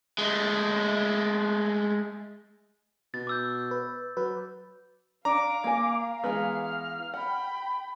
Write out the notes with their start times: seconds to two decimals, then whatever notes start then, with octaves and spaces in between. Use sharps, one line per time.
0.18 G#3 A3
3.14 B2 A6
3.27 D6 E6 G6
3.71 B4
4.17 F#3 B4
5.25 D4 F5 A#5 D6
5.64 A#3 G#5
6.24 E3 G#3 B3 F6
7.14 F#5 G5 B5